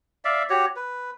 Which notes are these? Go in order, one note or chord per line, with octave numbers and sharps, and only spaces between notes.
D5 E5 F5
F#4 G4 C#5
B4